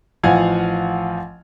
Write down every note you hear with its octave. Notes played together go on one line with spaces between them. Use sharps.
A1 F3 F5 F#5 G#5 G#6